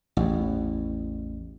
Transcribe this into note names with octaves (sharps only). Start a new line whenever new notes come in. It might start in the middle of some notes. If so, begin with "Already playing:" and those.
A1 E2